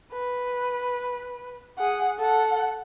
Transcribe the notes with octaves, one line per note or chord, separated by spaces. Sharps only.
B4
G#4 F#5
A4 F#5